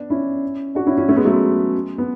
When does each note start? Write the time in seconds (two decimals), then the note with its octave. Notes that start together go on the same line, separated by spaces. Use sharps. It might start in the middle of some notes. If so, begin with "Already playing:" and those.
Already playing: B3 D4
0.10 C#4 E4
0.75 D4 F#4
0.87 C#4 E4
0.98 C#4 E4
1.09 A3 C#4
1.16 G#3 B3
1.25 F#3 A3
1.33 G#3
1.98 B3